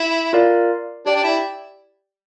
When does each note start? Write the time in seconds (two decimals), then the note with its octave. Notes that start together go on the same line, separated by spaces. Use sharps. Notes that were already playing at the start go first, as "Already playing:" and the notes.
Already playing: E4
0.33 F4 A#4 D5 F5
1.06 D4 G4 D5 G5
1.16 D4
1.24 E4